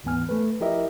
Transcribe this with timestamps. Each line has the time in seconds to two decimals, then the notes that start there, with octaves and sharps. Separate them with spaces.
0.04 D2 G#2 E3 B3 G#5 F6
0.29 A3 B4
0.60 F3 E4 G4 A#4 D#5 E5